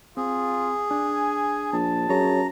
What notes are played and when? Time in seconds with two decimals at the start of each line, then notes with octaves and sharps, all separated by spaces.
0.17 C4 F4 G#4
0.91 D4 G#5
1.73 A#1 A5
2.09 F#2 G#4 C#5 A#5